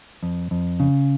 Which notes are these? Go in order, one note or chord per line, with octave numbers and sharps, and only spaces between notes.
F2
F2
C#3